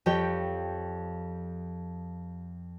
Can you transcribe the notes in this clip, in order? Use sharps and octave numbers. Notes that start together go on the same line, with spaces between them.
F2 F3 G4 C#5 G5 G6